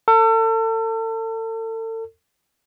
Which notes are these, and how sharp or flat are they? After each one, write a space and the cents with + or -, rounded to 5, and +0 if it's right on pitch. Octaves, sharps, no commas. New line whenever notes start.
A4 +35